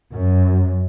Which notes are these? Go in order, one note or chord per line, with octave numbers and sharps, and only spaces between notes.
F#2